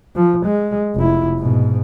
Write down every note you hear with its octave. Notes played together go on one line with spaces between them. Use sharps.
F3
G#3
F1 E4
G#2 B2